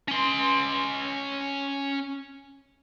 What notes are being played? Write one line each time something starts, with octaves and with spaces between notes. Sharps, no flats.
C#4 C6